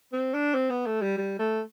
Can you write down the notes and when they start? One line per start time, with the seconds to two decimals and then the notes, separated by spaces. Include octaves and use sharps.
0.13 C4
0.34 D4
0.54 C4
0.70 B3
0.86 A3
1.02 G3
1.18 G3
1.39 A3